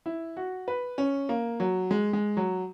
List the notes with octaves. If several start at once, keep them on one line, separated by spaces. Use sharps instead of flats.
E4
F#4
B4
C#4
A#3
F#3
G#3
G#3
F#3